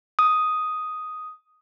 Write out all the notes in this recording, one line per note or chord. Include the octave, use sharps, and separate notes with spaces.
D#6